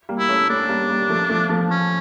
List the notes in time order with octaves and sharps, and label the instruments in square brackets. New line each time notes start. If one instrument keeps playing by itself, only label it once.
[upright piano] G3 A#3
[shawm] E4
[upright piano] A3 C#4
[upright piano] A3 C#4 [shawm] D4
[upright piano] G3 A#3
G3 A#3
F3 A3
F3 A3
F3 A3
[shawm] C#4